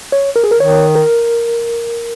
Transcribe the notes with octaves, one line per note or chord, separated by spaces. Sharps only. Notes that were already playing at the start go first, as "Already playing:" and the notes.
C#5
A#4
G#4
A#4
D#3 C#5
A#4